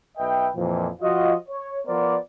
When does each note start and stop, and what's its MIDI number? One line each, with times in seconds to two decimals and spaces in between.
0.17 0.48 35
0.17 0.48 71
0.17 0.48 75
0.17 0.48 76
0.17 0.48 79
0.56 0.88 41
0.56 0.88 46
0.56 0.88 52
0.56 0.88 53
1.02 1.34 53
1.02 1.34 65
1.02 1.34 66
1.02 1.34 75
1.49 1.79 73
1.87 2.16 53
1.87 2.16 59
1.87 2.16 70
1.87 2.16 72
1.87 2.16 74